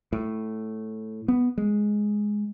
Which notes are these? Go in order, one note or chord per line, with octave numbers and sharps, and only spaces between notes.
A2
B3
G#3